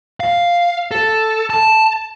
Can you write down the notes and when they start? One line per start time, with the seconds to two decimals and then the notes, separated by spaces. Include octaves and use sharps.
0.20 F5
0.91 A4
1.50 A5